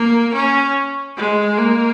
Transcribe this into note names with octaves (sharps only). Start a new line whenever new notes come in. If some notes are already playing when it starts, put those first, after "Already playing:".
Already playing: A#3
C#4
G#3
A#3